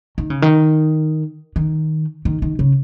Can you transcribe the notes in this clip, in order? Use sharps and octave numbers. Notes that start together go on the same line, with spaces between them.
D#3
C#3
D#3
D#3
D#3
D#3
C#3